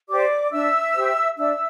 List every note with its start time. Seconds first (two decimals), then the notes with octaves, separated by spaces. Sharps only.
0.09 G4 C5 D5 D6
0.51 D4 E5 E6
0.95 G4 C5
1.37 D4 E5 E6